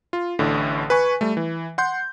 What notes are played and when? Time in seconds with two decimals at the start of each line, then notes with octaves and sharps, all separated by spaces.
0.13 F4
0.39 A1 A2 D3
0.90 B4 G#5 C#6
1.21 G3 A3
1.37 E3
1.78 F#5 C6 G6